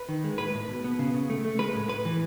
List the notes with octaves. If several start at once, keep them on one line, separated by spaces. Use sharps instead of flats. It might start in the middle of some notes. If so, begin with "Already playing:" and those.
Already playing: B4
D#3
G#3
A2 B4
A2
B2
B3
C#3
C#3
A3
A3
G#3 B4
A2
A2 B4
E3